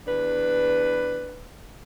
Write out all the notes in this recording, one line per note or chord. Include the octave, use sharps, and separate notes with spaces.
E2 D4 B4